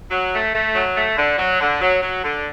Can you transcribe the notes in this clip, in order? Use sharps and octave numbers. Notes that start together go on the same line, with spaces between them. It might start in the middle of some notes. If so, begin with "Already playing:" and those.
F#3
A3
A3
F#3
A3
D3
F#3
D3
F#3
F#3
D3